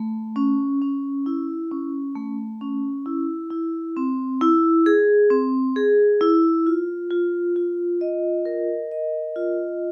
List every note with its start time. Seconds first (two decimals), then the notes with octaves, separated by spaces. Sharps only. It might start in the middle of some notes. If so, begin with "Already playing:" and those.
Already playing: A3
0.36 C#4
0.82 C#4
1.26 E4
1.71 C#4
2.16 A3
2.61 C#4
3.06 E4
3.51 E4
3.97 C4
4.41 E4
4.86 G#4
5.30 C4
5.76 G#4
6.21 E4
6.67 F4
7.11 F4
7.56 F4
8.01 D#5
8.45 A#4
8.91 D#5
9.36 F4